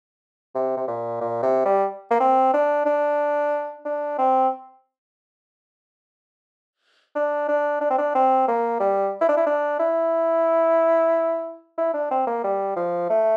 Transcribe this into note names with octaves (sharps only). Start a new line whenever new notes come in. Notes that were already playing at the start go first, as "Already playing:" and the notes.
C3
C3
A#2
A#2
C3
G3
A#3
C4
D4
D4
D4
C4
D4
D4
D4
C4
D4
C4
A#3
G3
E4
D4
E4
D4
E4
E4
D4
C4
A#3
G3
F3
A3